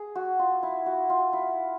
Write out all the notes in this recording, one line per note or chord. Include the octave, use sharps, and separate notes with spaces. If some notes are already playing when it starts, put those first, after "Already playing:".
Already playing: G#4
F#4
F4
E4
F#4
F4
E4